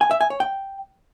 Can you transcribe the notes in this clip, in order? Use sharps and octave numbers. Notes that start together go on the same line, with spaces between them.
G#5
E5
G#5
C#5
G5